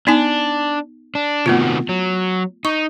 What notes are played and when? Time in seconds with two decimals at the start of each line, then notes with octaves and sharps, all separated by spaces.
0.07 B3 D4 D#4 G#5
1.15 D4
1.46 C3 D#3 A3 B3 F4 F#4
1.89 F#3
2.65 D#4 C#6